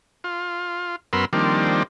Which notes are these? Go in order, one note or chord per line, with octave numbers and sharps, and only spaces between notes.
F4
F#2 B3 A#4 B5 C6 E6
D#3 F3 G3 A#3 C4 D4